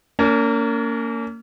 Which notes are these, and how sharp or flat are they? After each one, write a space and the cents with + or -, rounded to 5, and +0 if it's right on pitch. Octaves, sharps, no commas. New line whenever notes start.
A#3 -25 C#4 +40